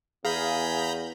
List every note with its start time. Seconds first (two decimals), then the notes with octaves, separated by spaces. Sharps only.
0.25 E2 G#4 F5 A#5 B5 G6